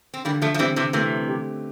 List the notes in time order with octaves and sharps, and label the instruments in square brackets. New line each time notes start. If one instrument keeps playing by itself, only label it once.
[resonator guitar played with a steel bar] C4
[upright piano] D3 [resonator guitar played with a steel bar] G3 A#3
[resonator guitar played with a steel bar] F3 A3
F3
[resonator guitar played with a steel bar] E3 G3 [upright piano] C4
[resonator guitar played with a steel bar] C3 E3
[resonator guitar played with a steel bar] C3 E3 [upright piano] A3
[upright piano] G4